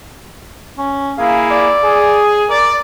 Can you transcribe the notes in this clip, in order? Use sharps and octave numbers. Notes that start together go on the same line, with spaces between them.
C#4
A#3 E4 G#4 F5
D5
G#4
A#4 D5